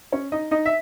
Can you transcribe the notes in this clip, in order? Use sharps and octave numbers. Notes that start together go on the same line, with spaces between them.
C#4 C#5
D#4 D#5
D#4 D#5
E5